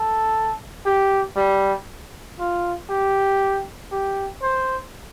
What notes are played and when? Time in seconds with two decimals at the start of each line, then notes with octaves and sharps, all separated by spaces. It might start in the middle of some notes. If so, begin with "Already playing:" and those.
Already playing: A4
0.86 G4
1.36 G3
2.39 F4
2.89 G4
3.91 G4
4.42 C5